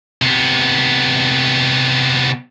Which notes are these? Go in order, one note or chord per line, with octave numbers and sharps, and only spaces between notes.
C3 B3